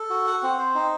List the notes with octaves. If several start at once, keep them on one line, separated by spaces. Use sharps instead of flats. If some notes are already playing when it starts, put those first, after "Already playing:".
Already playing: A4
F#4
F#5
C4
C5
D#4